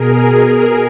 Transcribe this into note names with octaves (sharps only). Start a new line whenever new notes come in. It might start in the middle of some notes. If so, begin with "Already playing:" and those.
Already playing: B2 G#4 A#4